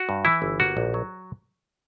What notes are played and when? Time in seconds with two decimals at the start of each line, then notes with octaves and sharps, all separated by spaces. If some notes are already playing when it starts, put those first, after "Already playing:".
Already playing: F#4
0.09 G2
0.25 E3 E4
0.42 G1
0.59 A#3 F#4
0.77 A#1
0.94 F#3